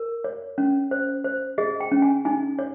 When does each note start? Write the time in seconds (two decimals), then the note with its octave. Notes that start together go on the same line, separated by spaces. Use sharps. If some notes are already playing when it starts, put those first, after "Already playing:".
Already playing: A#4
0.24 C#5
0.58 C#4
0.91 C5
1.24 C5
1.58 G#4 D#5
1.80 G5
1.92 C#4
2.02 G#5
2.25 D#4 G#5
2.59 C#5